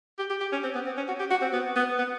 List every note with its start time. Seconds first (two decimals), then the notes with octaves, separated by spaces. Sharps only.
0.19 G4
0.30 G4
0.41 G4
0.52 C#4
0.64 C4
0.75 B3
0.86 C4
0.97 C#4
1.08 F#4
1.20 G4
1.31 F#4
1.41 C4
1.53 B3
1.76 B3
1.98 B3